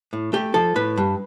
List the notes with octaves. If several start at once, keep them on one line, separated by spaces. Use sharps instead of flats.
A2
A3 G4
F3 A4
A2 B4
G2